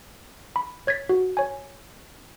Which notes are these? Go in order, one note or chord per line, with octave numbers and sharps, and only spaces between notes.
B5
C#5 G#6 A6 B6
F#4
C#5 G#5